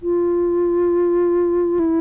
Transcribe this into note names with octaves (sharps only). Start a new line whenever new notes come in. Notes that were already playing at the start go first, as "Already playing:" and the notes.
F4
E4